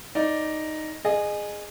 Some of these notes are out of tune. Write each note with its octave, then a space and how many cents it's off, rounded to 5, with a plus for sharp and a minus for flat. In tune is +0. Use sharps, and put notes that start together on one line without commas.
D#4 +0 D5 +0
G#4 +0 D#5 -30